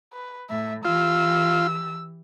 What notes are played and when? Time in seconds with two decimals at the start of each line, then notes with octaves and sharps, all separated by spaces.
0.13 B4
0.50 A2 E5
0.85 E3 F4 G4 E6